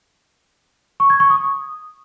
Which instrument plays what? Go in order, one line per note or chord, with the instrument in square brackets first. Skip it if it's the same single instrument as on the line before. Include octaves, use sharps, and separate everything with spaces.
[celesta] C#6
G#6
C#6
D#6